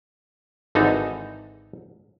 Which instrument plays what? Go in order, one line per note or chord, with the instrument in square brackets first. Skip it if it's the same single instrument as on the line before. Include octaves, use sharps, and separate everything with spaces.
[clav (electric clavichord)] G#1 D3 E3 D#4 A4 A#5